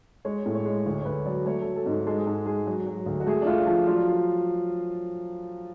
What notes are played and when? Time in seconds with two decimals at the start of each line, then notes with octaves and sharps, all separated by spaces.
0.25 G#3 C#5
0.46 A2
0.55 C#5
0.65 G#3
0.86 D2 C#5
1.02 C#5
1.05 D2 B4
1.25 F#3 D5
1.46 A3 C#5
1.61 F#3 A4
1.76 A4
1.86 G#2
1.91 A4
2.07 G#3 A4
2.18 G#4
2.26 G#2 A4
2.46 G#3 G#4
2.67 F#3
2.86 F#3
3.06 D2
3.20 F#4
3.26 A3 G#4
3.42 D4
3.46 A3 F4
3.67 F3 D4
3.86 F#3 F4